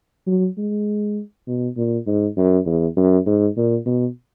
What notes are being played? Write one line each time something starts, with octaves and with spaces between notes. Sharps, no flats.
F#3
G#3
B2
A#2
G#2
F#2
E2
F#2
G#2
A#2
B2